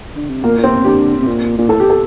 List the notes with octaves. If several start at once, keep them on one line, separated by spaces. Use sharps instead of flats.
D3
C3
A#2 A#3
A#2
C3 C4
D3 G4
C3
A#2
A#2
A2 A4
G4
A4